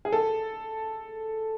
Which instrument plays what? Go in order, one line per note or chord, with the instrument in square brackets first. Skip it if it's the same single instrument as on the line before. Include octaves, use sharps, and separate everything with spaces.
[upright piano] G#4
A4